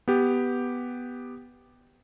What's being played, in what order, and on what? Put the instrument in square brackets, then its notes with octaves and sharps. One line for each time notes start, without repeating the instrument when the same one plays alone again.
[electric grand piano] B3 G4